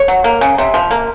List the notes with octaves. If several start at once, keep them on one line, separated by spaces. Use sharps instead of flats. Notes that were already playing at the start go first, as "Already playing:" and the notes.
Already playing: C#5
F#3
A#3
C#3
C3
F3
A#3